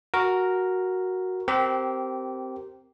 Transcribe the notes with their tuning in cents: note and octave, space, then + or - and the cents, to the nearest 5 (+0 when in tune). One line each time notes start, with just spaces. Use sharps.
F#4 +0 A#4 +0
C4 -5 G4 -20 A#4 +0